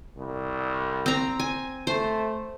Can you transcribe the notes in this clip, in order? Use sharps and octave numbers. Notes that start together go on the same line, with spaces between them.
C2
C4 A#5
G#5
A3 C5